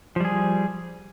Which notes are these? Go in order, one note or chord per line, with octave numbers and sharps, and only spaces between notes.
F3 G3 G#4